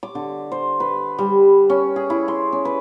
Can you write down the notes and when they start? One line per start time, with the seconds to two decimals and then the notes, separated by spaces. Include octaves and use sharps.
0.03 D6
0.15 D3
0.52 C5
0.80 B4
1.18 G3
1.70 C#4
1.96 G#4
2.10 E4
2.28 C6
2.53 C#4
2.65 B4